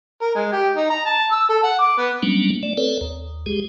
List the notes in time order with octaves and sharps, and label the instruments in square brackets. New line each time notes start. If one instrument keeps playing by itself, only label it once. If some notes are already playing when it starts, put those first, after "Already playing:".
[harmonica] A#4
G#3
G4
D#4
A#5
A5
E6
A4
F#5
D6
B3
[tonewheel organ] F#3 G3 A#3 B3 C#4 D4
A3 D5
C4 A4 B4 C#5 D5
D#2
G#3 G4 G#4